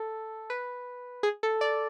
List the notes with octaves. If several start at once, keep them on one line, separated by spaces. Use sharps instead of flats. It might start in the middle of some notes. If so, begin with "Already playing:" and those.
Already playing: A4
B4
G#4
A4
D5